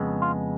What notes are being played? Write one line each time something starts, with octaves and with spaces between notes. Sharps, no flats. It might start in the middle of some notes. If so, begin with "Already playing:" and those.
Already playing: F2 C#3 G#3 B3
F4